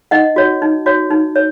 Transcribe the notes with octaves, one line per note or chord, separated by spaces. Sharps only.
D#4 D#5 F#5
F#4 C#5
D#4
F#4 C#5
D#4
C#5